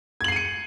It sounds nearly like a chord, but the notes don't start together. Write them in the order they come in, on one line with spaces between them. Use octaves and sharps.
G#6 F#7 C7 D#7 C#7